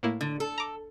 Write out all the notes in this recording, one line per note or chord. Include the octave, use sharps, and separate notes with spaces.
A2 A#3 E4
D3
A4
A#5 D6